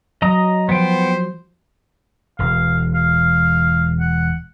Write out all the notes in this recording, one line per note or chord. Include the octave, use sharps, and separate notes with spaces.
F#3 D#5 A#5 D#6
F3 B3 C5 G5
E1 F5
F5
F#5